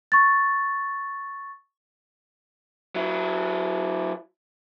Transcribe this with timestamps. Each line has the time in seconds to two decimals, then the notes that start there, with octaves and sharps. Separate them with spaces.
0.12 C#6 A6
2.95 F#3 E4